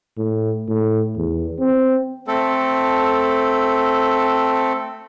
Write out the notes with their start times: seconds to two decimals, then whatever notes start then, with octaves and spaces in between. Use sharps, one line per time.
0.18 A2
0.68 A2
1.17 E2
1.59 C4
2.27 A3 C4 A4